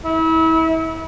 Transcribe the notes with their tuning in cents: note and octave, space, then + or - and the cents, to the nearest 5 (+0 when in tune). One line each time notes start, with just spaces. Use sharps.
E4 -30